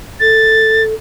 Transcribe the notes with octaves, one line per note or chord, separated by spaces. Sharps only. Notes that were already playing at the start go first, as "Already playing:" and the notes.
A4 A6